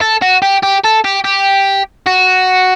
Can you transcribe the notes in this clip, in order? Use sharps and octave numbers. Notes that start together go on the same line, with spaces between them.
A4
F#4
G4
G4
A4
G4
G4
F#4